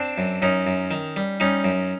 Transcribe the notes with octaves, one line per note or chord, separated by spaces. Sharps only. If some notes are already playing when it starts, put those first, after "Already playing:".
Already playing: C4 D4
F#2
F#2 C#4 D#4
F#2
D#3
G3
G3 C#4 D#4
F#2